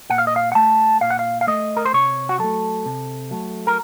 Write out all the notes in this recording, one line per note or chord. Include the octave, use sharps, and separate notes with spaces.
A#2 F#5
F5
D#5
F5
F#5
A3 A5
A#2 F5
F#5
F5
F5
A3 D#5
A#4
C5
C3 C#5
F#4
F#3 A3 A4
C3
F#3 A3
A#4